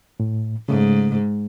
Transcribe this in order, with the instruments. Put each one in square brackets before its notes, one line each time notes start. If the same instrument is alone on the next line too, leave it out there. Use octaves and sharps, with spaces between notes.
[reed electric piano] A2
[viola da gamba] G#2 [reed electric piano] C#3 A3